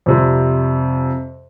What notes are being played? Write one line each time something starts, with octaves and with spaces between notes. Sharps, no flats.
F2 C3 G3